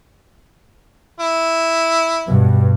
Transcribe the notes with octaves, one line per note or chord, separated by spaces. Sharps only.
E4
G2 B2